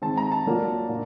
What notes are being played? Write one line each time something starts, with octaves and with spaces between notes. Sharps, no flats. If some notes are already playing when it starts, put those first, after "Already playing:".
D#3 G#3 C4 A5
A#5
A5
F#3 A#3 D4 F4
A#2